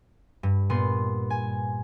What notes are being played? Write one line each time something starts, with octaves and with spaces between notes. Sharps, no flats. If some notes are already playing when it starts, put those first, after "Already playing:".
G2
A#2 B3 C6
G#5